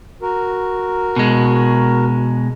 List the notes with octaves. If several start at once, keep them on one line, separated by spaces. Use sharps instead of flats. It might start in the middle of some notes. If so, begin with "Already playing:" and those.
F#4 A#4
B2 G#3